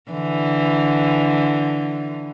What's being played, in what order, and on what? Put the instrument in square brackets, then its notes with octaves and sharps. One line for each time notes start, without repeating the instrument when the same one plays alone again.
[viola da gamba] D3 E3